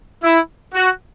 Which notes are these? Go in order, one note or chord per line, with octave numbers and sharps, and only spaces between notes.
E4
F#4